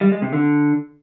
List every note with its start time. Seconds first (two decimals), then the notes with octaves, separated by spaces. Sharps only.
0.01 G3
0.12 G#3
0.22 C3
0.33 D3